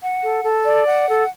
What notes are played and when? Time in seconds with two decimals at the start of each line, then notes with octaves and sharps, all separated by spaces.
0.03 F#5
0.24 A4
0.44 A4
0.65 D5
0.86 F#5
1.08 A4